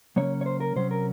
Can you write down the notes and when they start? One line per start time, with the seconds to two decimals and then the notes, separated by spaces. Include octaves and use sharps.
0.16 C#3 F#3 A#3 C#4 C#5
0.41 C#5
0.46 C5
0.60 A#4
0.76 C3 F#3 C#4 C5
0.91 A#4